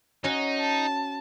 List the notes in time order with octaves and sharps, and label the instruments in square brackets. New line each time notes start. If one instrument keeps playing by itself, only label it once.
[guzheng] C#4 F#4 [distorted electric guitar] D#4
[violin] A5